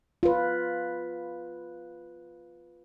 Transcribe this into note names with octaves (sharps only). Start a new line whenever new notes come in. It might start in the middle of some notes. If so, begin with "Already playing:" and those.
F4 B4